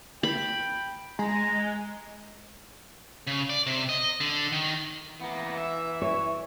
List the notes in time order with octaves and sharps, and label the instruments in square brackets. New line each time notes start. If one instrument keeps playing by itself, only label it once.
[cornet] G5 [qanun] B5
[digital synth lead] G#3 [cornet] A#5
[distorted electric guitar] C#3
D5
C3
D#5
D3
D#3
[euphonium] E3 [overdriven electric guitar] A#3 B3
[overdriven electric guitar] E5
[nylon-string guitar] C#5